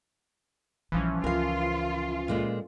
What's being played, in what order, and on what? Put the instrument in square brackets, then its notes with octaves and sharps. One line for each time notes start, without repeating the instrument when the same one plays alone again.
[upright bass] A#1 G3 [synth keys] E3 F3 C#4
[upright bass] C#2 [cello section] F4 [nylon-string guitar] A#4 F5
[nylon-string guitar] A#2 G#3 A3